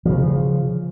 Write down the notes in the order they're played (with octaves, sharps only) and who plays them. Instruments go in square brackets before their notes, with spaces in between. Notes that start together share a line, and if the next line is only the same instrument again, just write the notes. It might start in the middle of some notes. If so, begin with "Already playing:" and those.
[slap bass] C#3 F3